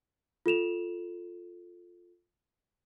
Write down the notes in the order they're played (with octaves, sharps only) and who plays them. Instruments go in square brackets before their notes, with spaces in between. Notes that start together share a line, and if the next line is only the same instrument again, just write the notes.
[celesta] F4 A4 E7 F7